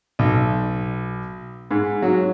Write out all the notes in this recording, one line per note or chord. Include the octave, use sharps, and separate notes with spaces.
B1
G#2
F#3